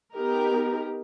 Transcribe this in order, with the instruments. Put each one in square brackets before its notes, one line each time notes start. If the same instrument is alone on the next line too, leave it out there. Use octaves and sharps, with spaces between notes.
[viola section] B3 D#4 G4 A#4